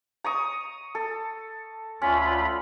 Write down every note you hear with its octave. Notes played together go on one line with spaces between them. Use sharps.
A#5 C#6 D#6
A4
D2 C#4 F4 B5